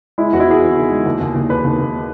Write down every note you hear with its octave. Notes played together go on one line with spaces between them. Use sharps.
G#3 E4
E2 F#4
E4
E2 G#4
E2
D#3
G#3
D#2
D#2
D#2
D#2 B4
D#2
D#2